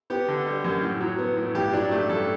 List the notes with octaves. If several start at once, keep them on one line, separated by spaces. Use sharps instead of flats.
B3 G4
D3
G3
F#2
A2
F#3
B3
A2
G2 G4
F#3 D4
A3 G4
G2 A4